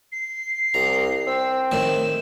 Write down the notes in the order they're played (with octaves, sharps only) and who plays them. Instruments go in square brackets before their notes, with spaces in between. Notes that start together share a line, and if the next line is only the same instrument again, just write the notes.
[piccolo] C7
[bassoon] C2 [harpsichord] A#5
[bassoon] C4 [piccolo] E6
[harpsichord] A2 D#3 [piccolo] E7